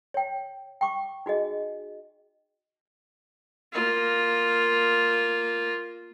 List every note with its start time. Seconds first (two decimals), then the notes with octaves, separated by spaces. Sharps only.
0.14 C#5 G5
0.81 G5 C#6 D6
1.26 D#4 F#4 G#4 D#5
3.72 A#3 F4